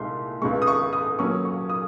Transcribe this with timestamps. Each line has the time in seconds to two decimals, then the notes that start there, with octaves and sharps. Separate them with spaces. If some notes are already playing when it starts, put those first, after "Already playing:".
Already playing: C2 A#2 G#3 D#4 C6
0.42 C#2 C#3 G#3 C#6
0.62 D#6
0.67 C#6
0.93 D#6
1.19 A#2 F#3 C#4 C#6
1.45 C#6
1.70 D#6